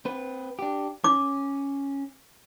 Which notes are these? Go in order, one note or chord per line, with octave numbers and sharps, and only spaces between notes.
C4 B4
D4 G4
C#4 D6